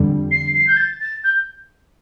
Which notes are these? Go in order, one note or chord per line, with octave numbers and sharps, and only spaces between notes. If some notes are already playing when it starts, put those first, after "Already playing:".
Already playing: F2 D3 G3
C7
C7
G6
A6
A6
G6